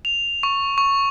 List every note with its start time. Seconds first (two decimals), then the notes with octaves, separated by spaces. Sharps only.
0.05 F7
0.43 C#6
0.78 C#6